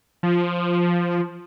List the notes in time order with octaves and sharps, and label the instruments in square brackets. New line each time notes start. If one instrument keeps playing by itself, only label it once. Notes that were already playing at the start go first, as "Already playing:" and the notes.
[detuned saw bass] F3